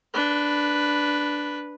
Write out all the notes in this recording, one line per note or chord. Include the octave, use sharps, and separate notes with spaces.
D4 B4